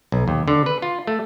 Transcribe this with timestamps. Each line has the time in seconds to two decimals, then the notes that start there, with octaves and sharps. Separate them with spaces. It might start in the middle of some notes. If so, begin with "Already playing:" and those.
0.12 B1
0.28 D#2
0.48 D3
0.66 B4
0.82 F4
1.07 A3